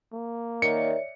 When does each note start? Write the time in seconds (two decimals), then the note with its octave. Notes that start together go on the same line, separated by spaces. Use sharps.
0.13 A#3
0.62 D#3 C#5 D5 E5 C#7